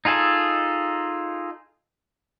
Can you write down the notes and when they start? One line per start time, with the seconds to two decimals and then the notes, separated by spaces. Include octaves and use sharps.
0.05 D#4 F4 G#4 A4